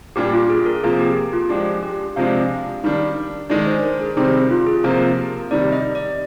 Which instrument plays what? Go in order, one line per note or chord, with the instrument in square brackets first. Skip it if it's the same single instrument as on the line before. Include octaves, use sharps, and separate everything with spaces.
[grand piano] A#2 G3 D4 [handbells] G4
[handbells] F4
G#4
A#4
[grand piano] C3 F3 A#3 [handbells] G#4
[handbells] G4
G4
F4
[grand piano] F3 G#3 D4 [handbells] G4
[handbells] G4
[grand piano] C3 F3 G#3 D4 [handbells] F5
[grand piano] D#3 G3 D4
[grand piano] D#3 G#3 D4 [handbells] D5
[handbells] C5
A#4
G#4
[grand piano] C3 D#3 G3 C4 [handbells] G4
[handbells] G4
F4
G#4
[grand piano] C3 F3 A#3 [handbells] A#4
[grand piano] C3 D#3 G3 [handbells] D5
[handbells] D#5
D5